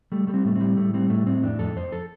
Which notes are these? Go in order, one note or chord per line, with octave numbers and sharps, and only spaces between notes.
G3 A3
G3 A3
C4
A2 A3
C4
G3
A2 A3
G3 C4
A2 A3
A2 C4
F2 D4
F2 A4
F2 C5
A4